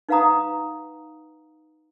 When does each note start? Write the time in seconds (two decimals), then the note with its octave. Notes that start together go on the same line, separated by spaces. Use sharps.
0.09 D#4 B4 F5 F#5 A#5 D#6